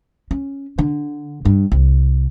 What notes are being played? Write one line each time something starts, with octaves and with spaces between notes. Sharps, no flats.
C#4
D3
G2
C2